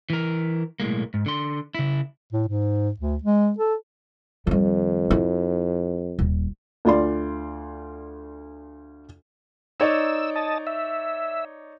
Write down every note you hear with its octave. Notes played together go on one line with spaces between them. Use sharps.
E3 A#4
B1 A2 G#3 A#3
G#2
D3 C6
C#3 E4
A2
G#2
D2
G#3
A4
F2 D#3 G3
E4
D#1
D2 F4 D5 C6
D#4 C#5 D5 E6
D#5 A5
E5